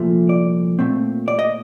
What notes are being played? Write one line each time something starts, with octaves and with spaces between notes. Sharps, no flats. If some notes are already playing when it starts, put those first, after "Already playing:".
Already playing: C2 A#2 F3 A3
D5
A#2 A3 C4
D5
D#5